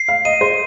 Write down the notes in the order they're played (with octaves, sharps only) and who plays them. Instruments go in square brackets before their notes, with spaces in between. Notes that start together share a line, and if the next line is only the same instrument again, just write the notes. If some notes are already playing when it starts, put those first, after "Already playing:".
Already playing: [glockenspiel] C7
[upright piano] F5
[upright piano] D#5 [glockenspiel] D#7
[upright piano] C5